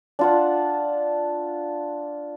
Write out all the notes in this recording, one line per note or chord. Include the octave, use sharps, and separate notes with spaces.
D4 F4 F#5